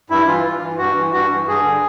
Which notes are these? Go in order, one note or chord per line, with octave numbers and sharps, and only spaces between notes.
G2 E4
E3 F4
G2
E3
G2 F#4
E3
G2 F#4
E3
G2 G#4
D3